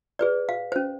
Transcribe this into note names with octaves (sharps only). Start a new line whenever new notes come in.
G#4 B4 D5
F5
C#4 C5